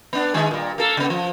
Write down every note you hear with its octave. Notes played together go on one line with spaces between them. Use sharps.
B3 D4
D#3 G#3 G#4
A#2 G3
A#3 A4
C#3 B3
F3